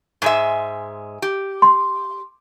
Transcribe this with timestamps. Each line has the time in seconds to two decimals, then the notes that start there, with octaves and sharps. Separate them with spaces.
0.22 G#2 G#3 E5
1.22 G4
1.62 C6